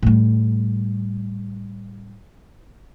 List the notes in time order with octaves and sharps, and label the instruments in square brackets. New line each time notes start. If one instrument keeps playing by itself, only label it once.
[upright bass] A2 G3